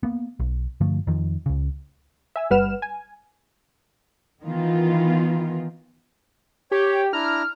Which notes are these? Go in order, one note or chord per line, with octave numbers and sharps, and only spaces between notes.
A#3 B3
B1
G2 D3 F3 A3
F2 D#3 F3
C#2 C#3
E5 G#5 E6
G1 G3 B4 F#5 F6 E7
G#5
D#3 E3 B3 F4
G4 C#5 G5
G4
D4 E4 A#5 F6